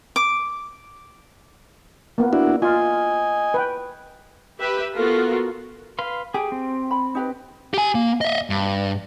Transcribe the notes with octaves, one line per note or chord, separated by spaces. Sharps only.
D6
A#3 B3
D4 E4 F#4
F4 D#5 G#5
B4 G5
G4 B4 E5
B3 F4 F#4 A4 A#4
B4 F5 C6
G4 G#4
C4
B5
D#4 G4 B4
G4 G#5
A#3
D#5 E5
G2